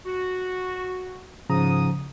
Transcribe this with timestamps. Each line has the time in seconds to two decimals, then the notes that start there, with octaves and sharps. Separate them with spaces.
0.06 F#4
1.50 G#2 C#3 F3 A#5 D#6